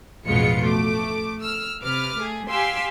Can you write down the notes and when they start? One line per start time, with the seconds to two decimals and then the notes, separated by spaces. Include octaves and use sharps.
0.25 A1 F2 B2 G#3 F4 C#7
0.63 A3 D6
1.42 E6 F6
1.82 C3 B4 D6 F6
2.18 A3 G#4
2.49 G4 F5 G#5 C6 E6